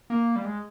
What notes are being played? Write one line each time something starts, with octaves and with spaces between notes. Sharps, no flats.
A#3
G3
G#3